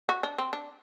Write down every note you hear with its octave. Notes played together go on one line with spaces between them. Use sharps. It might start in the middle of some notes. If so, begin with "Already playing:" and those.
F#4
D4
C4
D4